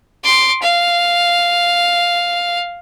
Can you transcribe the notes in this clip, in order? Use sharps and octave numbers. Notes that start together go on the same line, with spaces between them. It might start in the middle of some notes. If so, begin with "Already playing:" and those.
C6 D6
F5